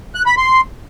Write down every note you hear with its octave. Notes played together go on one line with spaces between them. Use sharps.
F#6
B5
C6